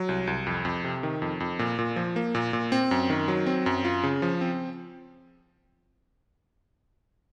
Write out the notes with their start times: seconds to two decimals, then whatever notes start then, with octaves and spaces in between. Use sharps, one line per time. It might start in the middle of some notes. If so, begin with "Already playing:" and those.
Already playing: F#3
0.09 C2
0.27 C2
0.47 F2
0.65 F2
0.84 C3
1.03 D#3
1.22 F2
1.40 F2
1.59 A#2
1.79 A#2
1.96 F3
2.16 A#3
2.35 A#2
2.53 A#2
2.72 C4
2.91 F#2
3.10 D#3
3.28 F#3
3.46 C4
3.66 F#2
3.84 F4
4.03 C#3
4.22 F3
4.41 C4